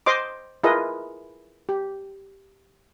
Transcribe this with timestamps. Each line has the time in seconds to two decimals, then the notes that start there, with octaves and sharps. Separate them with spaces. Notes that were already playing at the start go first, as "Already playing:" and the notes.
0.06 C5 D#5 C6 D6
0.64 E4 F4 G#4 A#4 B4 D#5
1.69 G4